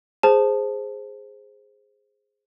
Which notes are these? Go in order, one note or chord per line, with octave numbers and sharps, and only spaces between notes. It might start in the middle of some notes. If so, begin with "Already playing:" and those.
G#4 C5 A5